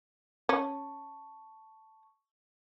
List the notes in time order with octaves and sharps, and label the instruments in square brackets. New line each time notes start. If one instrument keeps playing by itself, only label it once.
[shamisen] C#4 [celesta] A5 C#6